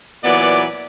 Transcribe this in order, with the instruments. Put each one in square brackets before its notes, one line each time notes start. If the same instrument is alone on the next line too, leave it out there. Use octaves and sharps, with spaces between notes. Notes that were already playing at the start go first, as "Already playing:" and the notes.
[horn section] A#2 E3 F#3 B3 D5